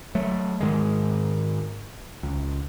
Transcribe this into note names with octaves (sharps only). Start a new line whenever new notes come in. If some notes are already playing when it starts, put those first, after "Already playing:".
F#3 A3
G#2 D#3 G#3
C#2